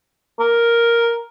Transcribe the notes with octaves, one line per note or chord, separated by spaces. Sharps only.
A#4